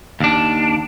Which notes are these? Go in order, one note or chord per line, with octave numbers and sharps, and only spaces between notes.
D#2 D4